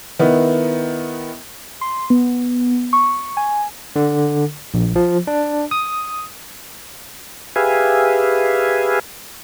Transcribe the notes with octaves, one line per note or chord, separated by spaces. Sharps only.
D#3 B3 E4
C6
B3
C#6
G#5
D3
A#1
F3
D4
D#6
G4 G#4 B4 E5 F5 G#5